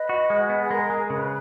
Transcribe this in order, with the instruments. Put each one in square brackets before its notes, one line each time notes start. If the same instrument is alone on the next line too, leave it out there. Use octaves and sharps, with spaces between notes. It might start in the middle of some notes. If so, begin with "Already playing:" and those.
Already playing: [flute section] B4 D#5
[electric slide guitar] F#4
G#3
B3
[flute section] G#4
[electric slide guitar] G#3 [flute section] A#4
[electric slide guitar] G#3
[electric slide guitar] C#3 [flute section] B4